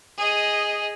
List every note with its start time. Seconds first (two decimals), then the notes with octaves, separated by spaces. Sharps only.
0.18 G#4 D#5